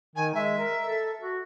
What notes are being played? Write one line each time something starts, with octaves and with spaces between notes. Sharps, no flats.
D#3 G#5
G#3 E5
A#4
A4
F#4